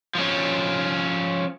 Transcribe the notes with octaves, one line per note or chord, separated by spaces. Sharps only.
F3 C#4